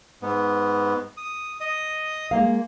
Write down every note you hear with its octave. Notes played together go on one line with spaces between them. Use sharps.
G#2 B3
D#6
D#5 D#6
G#3 A#3 F5